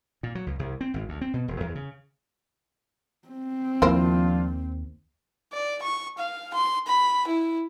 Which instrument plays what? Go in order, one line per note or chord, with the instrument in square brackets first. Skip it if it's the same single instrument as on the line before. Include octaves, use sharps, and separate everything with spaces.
[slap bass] A#2
F#3
C#2
C2
C4
G#1
D2
C4
B2
E1
E2
C#3
[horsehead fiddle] C4
[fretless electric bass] D#2 A#3 [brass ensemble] F3 D4 F4 [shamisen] E4 A#4 C5
[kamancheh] D5
C#6
F5
C6
B5
E4